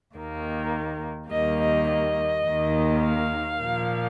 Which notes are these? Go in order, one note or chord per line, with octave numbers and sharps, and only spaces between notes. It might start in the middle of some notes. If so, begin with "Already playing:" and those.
D#2 D#3 A#3
D#2 D#3 G3 A#3 D#5
D#5
D#5
D#2 D#3 A#3
F5
A#2 F3 A#3